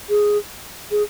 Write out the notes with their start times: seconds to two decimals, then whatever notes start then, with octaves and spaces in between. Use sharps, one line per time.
0.09 G#4
0.91 G#4